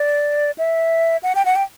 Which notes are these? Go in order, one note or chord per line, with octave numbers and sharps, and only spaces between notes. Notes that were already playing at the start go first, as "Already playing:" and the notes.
Already playing: D5
E5
F#5
G5
F#5
G5